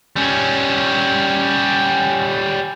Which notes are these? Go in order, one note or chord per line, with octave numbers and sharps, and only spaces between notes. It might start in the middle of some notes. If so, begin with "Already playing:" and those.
G3 C#4